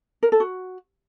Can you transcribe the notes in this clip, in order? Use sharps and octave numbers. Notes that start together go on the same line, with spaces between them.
A#4
A4
F#4